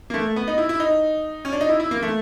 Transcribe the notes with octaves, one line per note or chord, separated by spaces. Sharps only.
A#3
A3
B3
D#4
E4
E4
D#4
C#4
D4
D#4
E4
E4
A#3
A3